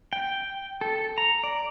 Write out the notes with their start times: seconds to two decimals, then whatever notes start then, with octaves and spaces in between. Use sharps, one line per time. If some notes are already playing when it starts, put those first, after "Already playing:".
0.13 G5
0.81 A4
1.18 A#5
1.44 D5